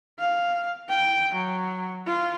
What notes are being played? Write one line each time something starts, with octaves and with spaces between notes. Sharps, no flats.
F5
G5
F#3
F4